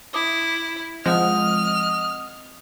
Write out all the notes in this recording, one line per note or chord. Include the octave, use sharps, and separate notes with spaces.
E4 D6 D#6
F3 G#3 C4 D#5 F#5 D#6 F6